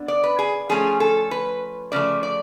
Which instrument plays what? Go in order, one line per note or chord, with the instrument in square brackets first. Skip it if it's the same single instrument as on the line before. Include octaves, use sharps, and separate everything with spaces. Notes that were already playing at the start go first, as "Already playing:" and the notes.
Already playing: [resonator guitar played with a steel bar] D3 B3 D4
D5
B4
G#4
F3 A3 C#4 G#4
A4
B4
C#3 F3 A3 D5
D5